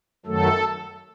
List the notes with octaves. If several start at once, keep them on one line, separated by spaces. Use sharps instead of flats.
F#2 D#3 F#3 A3 A4